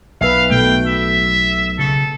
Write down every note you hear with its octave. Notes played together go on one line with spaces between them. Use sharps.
B1 B4 E5 F5
B2 A3 G5
E5
C#3 A4